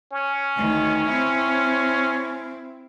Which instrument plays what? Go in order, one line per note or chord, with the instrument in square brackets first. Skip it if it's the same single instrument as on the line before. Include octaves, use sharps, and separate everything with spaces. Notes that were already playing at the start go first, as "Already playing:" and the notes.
[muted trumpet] C#4
[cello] D2 D#3
C4 E4